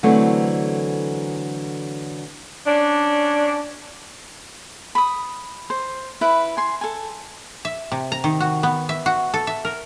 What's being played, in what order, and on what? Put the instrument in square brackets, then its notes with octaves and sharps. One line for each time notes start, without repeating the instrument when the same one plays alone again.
[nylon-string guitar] D3 E3 F#3 A3 C4
[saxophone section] C#4 D4
[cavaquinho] B5 D#6
C5
E4 B4
G#5 C6
A4 G#5
[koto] E5
C3
A#5
D#3
F#4
B3
E5
F#4
A4
E5
A#4